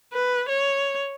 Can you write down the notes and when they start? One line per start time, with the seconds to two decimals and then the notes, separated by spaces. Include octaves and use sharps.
0.13 B4
0.49 C#5